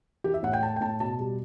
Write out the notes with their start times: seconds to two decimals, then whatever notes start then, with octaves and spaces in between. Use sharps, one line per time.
0.24 E3 G4
0.34 E5
0.43 A2 F#5
0.53 G5
0.62 A3 A5
0.76 G5
0.81 A2 A5
1.00 B2 A5
1.19 G3